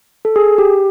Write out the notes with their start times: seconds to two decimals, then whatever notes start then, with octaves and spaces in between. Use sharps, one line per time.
0.25 A4
0.36 G#4
0.58 G4